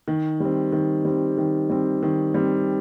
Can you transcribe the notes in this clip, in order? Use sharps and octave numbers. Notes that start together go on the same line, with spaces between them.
D#3
G3 C4
D#3
G3 C4
D#3
G3 C4
D#3
G3 C4